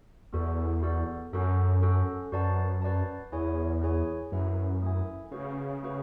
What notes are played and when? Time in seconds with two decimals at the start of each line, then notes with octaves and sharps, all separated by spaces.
0.33 E2 B3 F#4 A4 D5
0.82 B3 F#4 A4 D5
1.33 F#2 C#4 F#4 A4
1.82 C#4 F#4 A4
2.32 F#2 F#4 B4 D5 A5
2.82 F#4 B4 D5 A5
3.32 E2 E4 G#4 C#5 G#5
3.82 E4 G#4 C#5 G#5
4.31 F#2 A3 E4 B4 E5 G#5
4.82 A3 E4 B4 E5 G#5
5.31 C#3 A3 C#4 F#4 B4
5.82 A3 C#4 F#4 B4